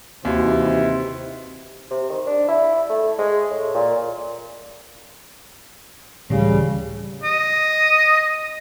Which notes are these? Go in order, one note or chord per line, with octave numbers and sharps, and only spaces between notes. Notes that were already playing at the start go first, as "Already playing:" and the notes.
D#2 C3 E3 D#4 E4 F#4 C5
C3
D#3
D4
E4
A3
G#3
A2
A#2
C#2 A2 C#3 E3 G3
D#5